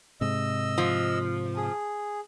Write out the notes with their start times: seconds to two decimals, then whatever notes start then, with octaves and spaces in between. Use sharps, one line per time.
0.21 G#2 C3 D#5 E6
0.78 F3
1.57 G#4